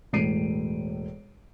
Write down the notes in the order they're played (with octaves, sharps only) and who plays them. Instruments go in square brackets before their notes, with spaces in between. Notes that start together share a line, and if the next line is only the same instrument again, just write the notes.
[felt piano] E1 A2 C7 D7 D#7